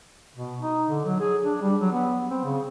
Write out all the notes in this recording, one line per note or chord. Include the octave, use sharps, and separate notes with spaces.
B2
D#4
D3
F#3
G#4
D4
G3
F#3
B3
C4
C#3